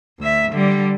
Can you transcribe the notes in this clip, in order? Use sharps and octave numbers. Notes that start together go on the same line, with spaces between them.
D2 E5
D3 G3